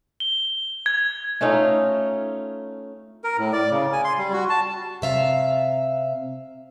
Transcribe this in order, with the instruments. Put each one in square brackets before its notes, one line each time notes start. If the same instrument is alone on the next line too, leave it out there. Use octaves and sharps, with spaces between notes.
[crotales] G7
G#6
[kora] A3 C#4 D#4 F4
[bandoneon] A#4
A2
D5
C#3
G#5
C6
G3
F#4
A5
[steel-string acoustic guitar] C3 E5 F5